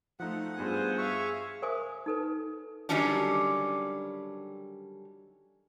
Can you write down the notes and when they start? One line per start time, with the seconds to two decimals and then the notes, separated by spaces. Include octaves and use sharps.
0.20 F3 A3 D#4 F4 F#5
0.58 G2 B3 F4 G#4 C5
0.98 E5 F5 C#6
1.62 A#4 C5 E5 G#5 D6 D#6
2.06 D#4 A4 B4
2.89 D3 D#3 F#3 G3 C#4 D4